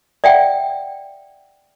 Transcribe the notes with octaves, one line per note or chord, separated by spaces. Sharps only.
D5 E5 F#5 G5